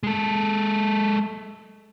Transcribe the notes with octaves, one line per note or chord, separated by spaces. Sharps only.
G#3 A4